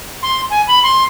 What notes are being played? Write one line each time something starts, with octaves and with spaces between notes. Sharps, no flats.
C6
G#5
B5
C6